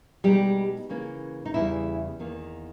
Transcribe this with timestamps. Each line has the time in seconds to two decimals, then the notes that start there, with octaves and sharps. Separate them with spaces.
0.24 B2 G3 G#3 D#4 G4
0.89 C#3 E3 A#3 C#4
1.45 D#4
1.54 E2 C#3 G3 E4
2.20 E2 D#3 A#3